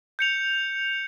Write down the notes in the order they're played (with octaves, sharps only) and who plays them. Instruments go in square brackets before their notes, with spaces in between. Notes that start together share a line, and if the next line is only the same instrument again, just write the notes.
[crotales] G6 C#7 F7